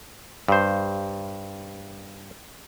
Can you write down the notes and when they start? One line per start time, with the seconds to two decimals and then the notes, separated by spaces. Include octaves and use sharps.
0.48 G2 C5